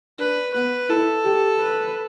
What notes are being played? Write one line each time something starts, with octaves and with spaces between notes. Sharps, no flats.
D4 B4
B3 B4
E4 A4
G4
B4